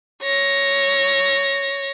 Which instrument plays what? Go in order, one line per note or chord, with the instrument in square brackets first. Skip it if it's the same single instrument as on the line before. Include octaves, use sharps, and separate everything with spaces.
[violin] C#5 A#6